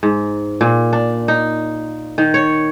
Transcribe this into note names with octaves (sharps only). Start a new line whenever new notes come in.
G#2
A#2
D4
D#4
D#3
C#5